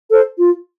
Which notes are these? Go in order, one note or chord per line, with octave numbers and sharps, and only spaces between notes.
A4 C5
F4